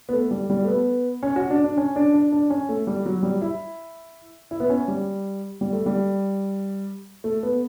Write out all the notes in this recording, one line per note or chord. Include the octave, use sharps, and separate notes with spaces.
B3
A3
G3
G3
A3
B3
C#4
F#4
D4
D4
C#4
D4
D4
D4
C#4
A3
G3
F#3
G3
E4
E4
B3
C#4
G3
G3
A3
G3
A3
B3